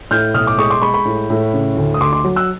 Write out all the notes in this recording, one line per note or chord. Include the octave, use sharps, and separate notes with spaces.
A2 F6 G6
B1 D#6 F6
D6
G#3 C#6 D#6
C6 D6
G#3 B5 C#6
B5 C#6
A2
A2
C#3
D2
D#6
D2 C6 D6
C6 D6
F#3
E6 F#6